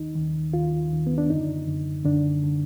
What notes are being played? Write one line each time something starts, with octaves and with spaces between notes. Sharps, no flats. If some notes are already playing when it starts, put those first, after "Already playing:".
Already playing: D#2 D#3 D#4
D#2 D#3
D#2 D#3 F4
D#2 D#3
B3
D4
F#2 D3 D#4
F#2 D3
F#2 D3 D4
D3